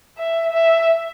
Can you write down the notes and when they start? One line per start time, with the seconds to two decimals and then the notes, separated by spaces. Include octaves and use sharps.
0.18 E5
0.53 E5